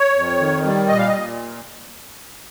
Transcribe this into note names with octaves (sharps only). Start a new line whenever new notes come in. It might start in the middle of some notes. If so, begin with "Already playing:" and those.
Already playing: C#5
F2
D#3
G3
A#2 D#5
F5
D#5
A#2